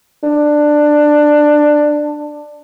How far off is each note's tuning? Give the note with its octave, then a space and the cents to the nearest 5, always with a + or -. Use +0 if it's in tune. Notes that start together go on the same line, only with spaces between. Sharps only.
D4 +10